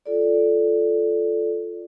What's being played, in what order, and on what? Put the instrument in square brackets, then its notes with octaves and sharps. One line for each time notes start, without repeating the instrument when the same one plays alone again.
[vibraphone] F4 A4 D5